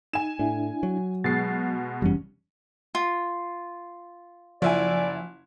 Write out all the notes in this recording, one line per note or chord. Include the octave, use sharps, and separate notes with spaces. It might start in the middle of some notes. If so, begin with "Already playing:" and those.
D#4 G#5 E7
A2 D4 E4
F#3
B2 G#3 A6 C7
F1 F#2 E3 G3 C#4
F4
F#1 F3 E4 D5 G#5